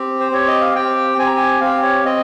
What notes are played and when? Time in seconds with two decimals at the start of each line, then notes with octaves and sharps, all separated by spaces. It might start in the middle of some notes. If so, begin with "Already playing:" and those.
Already playing: C4 G4
0.20 C5
0.31 C4 G4 C#5
0.48 D#5
0.61 F5
0.75 C4 G4 G5
1.18 C4 G4 G#5
1.27 A#5
1.36 G#5
1.61 C4 G4 F5
1.82 C#5
2.05 C4 D#5